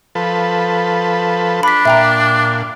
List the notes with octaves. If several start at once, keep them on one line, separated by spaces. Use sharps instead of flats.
F3 A4 B4
D4 B5 B6
A#2 E5 G5 A#5